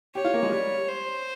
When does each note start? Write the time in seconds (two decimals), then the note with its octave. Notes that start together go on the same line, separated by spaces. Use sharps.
0.15 G4 C#5
0.25 F4
0.34 A#3
0.43 G#3
0.52 G3
0.88 C5